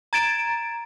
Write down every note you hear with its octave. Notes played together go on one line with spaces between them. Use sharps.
A#5 G#6 A6 D7 E7